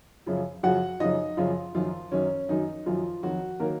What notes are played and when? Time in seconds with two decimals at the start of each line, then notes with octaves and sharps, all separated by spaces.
0.26 F#2 C#3 F3
0.63 F#2 C#3 F3 F#4 F#5
1.00 F#2 C#3 F3 D#4 D#5
1.37 F#2 C#3 F3 F4
1.75 F#2 D#3 F3 F#3 F4
2.12 F#2 D#3 F#3 C#4
2.49 F#2 D#3 F#3 D#4
2.86 F#2 D#3 F3 F#3 F4
3.23 F2 D#3 F#3 F#4
3.60 D#3 F#3 A#3 A#4